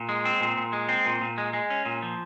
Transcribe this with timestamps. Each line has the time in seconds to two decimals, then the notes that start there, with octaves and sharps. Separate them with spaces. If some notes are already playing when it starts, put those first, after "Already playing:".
Already playing: A#2
0.09 G#3
0.25 C4
0.41 A#2
0.57 A#2
0.73 G#3
0.89 C4
1.06 A#2
1.21 A#2
1.38 G#3
1.53 G#3
1.70 C#4
1.85 A#2
2.02 F3